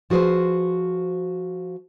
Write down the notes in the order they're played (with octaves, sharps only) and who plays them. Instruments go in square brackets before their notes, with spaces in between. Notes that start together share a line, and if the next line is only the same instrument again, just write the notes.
[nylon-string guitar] F3 F#4 G#4 B4 C5